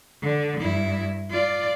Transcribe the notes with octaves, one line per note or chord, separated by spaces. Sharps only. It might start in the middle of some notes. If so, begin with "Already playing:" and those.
D3
G2 E4
F4 D5